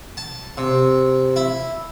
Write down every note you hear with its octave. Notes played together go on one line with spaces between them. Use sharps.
A5
C3
E4